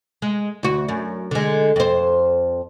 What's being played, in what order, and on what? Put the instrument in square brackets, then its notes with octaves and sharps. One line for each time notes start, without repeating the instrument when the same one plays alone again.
[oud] G#3
D2 F#4
F#2
D3 G#3
F2 C5